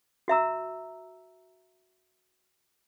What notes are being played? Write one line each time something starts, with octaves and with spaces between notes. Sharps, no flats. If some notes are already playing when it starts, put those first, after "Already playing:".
F#4 E5 A#5 E6